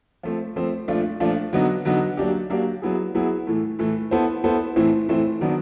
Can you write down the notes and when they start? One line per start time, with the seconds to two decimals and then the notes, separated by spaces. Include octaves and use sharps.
0.23 F3 A3 C4
0.56 F3 A3 C4
0.88 A#2 F3 A3 D4 F4
1.20 A#2 F3 A3 D4 F4
1.53 D3 F#3 B3 D#4
1.85 D3 F#3 B3 D#4
2.17 F#3 A#3 D4 G4
2.50 F#3 A#3 D4 G4
2.82 F#3 B3 E4 G#4
3.15 F#3 B3 E4 G#4
3.47 A2 E3 A3
3.79 A2 E3 A3
4.11 B3 E4 A4 C5
4.44 B3 E4 A4 C5
4.76 A2 E3 A3 C4 E4
5.09 A2 E3 A3 C4 E4
5.41 D#3 F#3 B3 D4